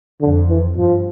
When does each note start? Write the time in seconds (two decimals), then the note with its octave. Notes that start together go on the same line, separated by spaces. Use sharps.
0.21 F2 D3
0.49 E3
0.77 G2 F3